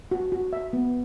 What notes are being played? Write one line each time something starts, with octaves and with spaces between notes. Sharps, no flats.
F#4
F#4
E5
B3